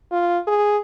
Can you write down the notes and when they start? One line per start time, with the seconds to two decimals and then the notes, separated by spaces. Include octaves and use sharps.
0.12 F4
0.47 G#4